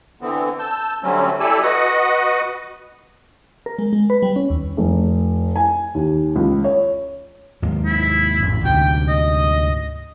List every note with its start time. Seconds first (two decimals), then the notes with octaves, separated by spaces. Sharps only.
0.21 D3 E3 B3 C4
0.59 A5 E6 G6
1.03 D3 F#3 G3 A3 C4 C#4
1.40 E4 G4 A4 D5 G#5 E6
1.62 F#4 B4 D#5 F#5 D#6
3.66 A#4
3.79 G#3
3.93 G#3
4.10 B4
4.22 G3
4.36 C#4
4.50 D#2
4.77 F1
5.56 G#5
5.94 D#2
6.36 C#2
6.64 C#5
7.62 D#2 G#2 A#3
7.85 E4
8.43 A1 F2
8.65 D2 G#2 C3 G5
9.08 D#5